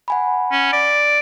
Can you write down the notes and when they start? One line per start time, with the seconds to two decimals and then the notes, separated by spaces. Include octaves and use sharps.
0.08 F#5 G#5 B5
0.51 C#4
0.73 D5